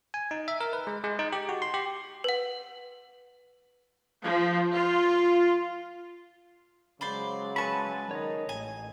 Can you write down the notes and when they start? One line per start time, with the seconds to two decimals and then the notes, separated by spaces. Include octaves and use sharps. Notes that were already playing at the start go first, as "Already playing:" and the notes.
0.14 G#5
0.31 D#4
0.48 E5
0.61 A#4
0.73 B4
0.87 G#3
1.04 G#3
1.19 D#4
1.32 G4
1.49 F#4
1.62 C6
1.74 G4
2.24 B4 F#5
4.22 F3
4.73 F4
7.01 C#3 F#3 G#3 C5 D5 B5
7.56 B4 G#5 A5 B5 C#6
8.11 D#3 C#5 D#5
8.49 A1 G#5